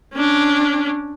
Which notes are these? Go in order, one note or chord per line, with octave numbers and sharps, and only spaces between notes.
C#4 D4